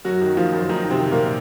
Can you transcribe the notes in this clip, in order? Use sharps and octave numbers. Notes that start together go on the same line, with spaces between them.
F#2 F#3 F#4
D#3
D#3 F3 F4
F#2
F#2 D#3 D#4
D#3
C3 C4
D#3
A#2 A#3